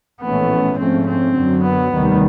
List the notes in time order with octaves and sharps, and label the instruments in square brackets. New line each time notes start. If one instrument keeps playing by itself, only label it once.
[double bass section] A#1 A2 E3 A3 C#4 [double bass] B3
[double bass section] G#2 F3 A3 C#4 [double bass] C4
[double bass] C4
[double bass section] F#2 D3 F#3
[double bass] B3
[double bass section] F1 D#2 D#3 G3